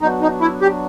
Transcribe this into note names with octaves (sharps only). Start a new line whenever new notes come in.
F#3 B3 D4 D#4 F#4
D#4
E4
G4